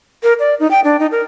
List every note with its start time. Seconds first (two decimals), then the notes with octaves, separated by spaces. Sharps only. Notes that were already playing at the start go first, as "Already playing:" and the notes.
0.23 A#4
0.40 D5
0.60 D#4
0.71 G5
0.84 D4
1.00 D#4
1.12 A#4